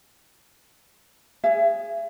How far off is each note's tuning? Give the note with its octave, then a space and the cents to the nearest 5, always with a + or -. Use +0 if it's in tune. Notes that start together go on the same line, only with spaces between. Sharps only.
G#4 +0 E5 +35